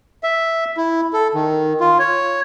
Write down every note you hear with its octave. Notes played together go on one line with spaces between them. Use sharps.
E5
E4
A4
D#3
F4
C#5